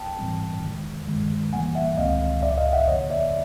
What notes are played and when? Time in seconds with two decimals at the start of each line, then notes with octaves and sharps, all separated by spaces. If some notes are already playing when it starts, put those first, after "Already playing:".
Already playing: G5 A5
0.18 G#2 E3 G3 C4
0.63 C3 D#3 G#3
1.08 G2 D#3 G#3
1.52 C3 E3 G3 A#3 F#5 G#5
1.75 E5 F#5
1.97 C#2 C3 D#3 G#3 C4 D#5 F5
2.42 C#2 C3 F3 D5 E5
2.58 D#5 F5
2.73 E5 F#5
2.88 F#2 D3 F3 A#3 C#5 D#5
3.10 D5 E5